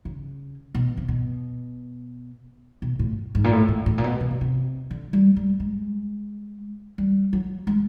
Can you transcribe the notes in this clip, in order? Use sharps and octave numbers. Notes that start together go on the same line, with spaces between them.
C#3
B2
C3
B2
B2
A2
G#2
A#2
A2
A2
A2
A#2
B2
C3
B2
C3
D3
G3
G3
G#3
G3
F#3
G#3